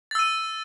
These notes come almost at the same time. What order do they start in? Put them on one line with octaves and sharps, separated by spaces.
A6 E6 D#7